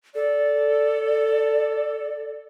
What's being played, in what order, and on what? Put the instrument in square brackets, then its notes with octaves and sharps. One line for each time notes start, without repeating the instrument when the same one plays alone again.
[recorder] A4 [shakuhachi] D5